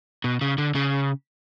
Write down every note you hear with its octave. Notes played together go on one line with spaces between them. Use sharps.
B2
C#3
D3
C#3